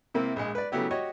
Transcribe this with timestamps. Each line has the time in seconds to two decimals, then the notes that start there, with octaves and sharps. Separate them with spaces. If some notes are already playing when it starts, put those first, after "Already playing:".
0.14 C3 A#3 C4 E4
0.36 A#1 G#3
0.55 B4 D5
0.72 C#3 F#3 A3 B3 E4 G4
0.91 F#4 G4 C#5 D#5